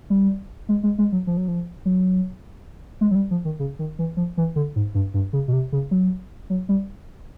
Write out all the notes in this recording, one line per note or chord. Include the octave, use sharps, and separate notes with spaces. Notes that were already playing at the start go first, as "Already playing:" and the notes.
G3
G#3
G#3
G#3
F#3
F3
F#3
F3
F#3
G#3
F#3
G3
F3
D#3
C#3
D#3
E3
F3
E3
D3
G#2
G2
G2
C#3
B2
C3
C#3
F#3
F#3
G3